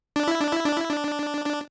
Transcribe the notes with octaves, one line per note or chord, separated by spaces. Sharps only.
D4
E4
D4
E4
D4
E4
D4
D4